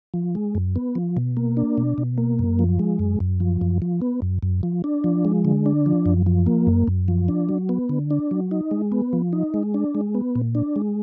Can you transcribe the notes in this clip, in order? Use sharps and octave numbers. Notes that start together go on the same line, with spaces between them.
F3
G#3
F#2
B3
F3
B2
A#3
D4
B2
B2
A#3
F#2
F3
G#3
F#2
F#2
F3
F#2
F3
B3
F#2
F#2
F3
D4
F3
G#3
D3
D4
F3
F#2
F3
A#3
F#2
F#2
F3
D4
F#3
B3
D3
D4
F#3
D#4
G#3
B3
F3
D#4
G#3
D4
G#3
B3
A#2
D4
G#3